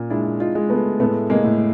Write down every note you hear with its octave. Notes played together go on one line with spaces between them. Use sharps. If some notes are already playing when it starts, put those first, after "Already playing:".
Already playing: A#2 C#4
G#3 D4 E4
D#4 F4
G#3
A3 B3
A2 A3 B3
G#3 A#3
A2